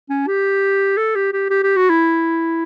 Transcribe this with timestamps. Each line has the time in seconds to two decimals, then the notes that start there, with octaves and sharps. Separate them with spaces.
0.10 C#4
0.28 G4
0.97 A4
1.15 G4
1.33 G4
1.50 G4
1.63 G4
1.77 F#4
1.90 E4